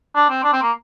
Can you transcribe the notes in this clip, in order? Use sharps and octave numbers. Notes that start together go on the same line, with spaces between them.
D4
C4
D4
C4
A#3